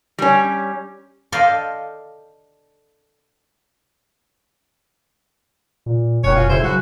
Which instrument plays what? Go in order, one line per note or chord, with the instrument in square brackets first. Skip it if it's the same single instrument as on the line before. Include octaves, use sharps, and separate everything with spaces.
[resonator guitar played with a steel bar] G3 C#4
[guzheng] A4 C5 D5 D#5 F5
[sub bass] A#2
[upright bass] F1 B1 [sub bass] F#2 [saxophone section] D#3 F#4 C#5
[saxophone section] F#3 C#4 F4
[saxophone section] D2 E4 C5 [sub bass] C#3
[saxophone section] F#2 F#4 [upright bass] F#3